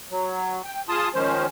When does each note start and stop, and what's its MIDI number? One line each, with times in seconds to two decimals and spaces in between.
0.10 0.62 54
0.64 0.82 79
0.89 1.09 65
0.89 1.09 68
0.89 1.09 81
0.89 1.09 84
0.89 1.09 87
1.14 1.47 51
1.14 1.47 53
1.14 1.47 56
1.14 1.47 61
1.14 1.47 72